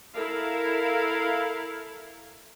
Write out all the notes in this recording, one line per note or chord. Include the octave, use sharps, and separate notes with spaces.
E4 A4 A#4 F5